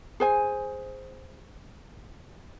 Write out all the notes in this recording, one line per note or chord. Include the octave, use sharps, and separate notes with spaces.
G#4 C5 G#5